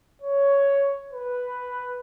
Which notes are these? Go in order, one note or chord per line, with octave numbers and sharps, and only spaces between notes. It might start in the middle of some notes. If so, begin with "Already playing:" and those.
C#5
B4